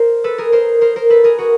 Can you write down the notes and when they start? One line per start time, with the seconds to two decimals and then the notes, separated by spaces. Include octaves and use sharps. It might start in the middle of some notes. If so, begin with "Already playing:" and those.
Already playing: A#4 C5
0.24 A4 B4
0.38 G#4 A#4
0.52 A#4 C5
0.81 A#4 C5
0.96 A#4 C5
1.10 A4 B4
1.24 G#4 A#4
1.38 F#4 G#4